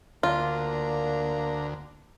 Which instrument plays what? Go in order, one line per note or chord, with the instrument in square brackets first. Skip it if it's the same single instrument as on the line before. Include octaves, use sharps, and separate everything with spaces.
[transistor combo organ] D2 [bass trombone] A#3 [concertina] D4 A#5 [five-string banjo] F4